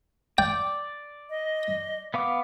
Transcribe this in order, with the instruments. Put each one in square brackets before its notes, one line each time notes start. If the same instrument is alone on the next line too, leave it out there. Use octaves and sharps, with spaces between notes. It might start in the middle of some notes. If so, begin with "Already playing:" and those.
[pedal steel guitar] D5 [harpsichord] G5
[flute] D#5
[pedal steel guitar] B3 F5 D6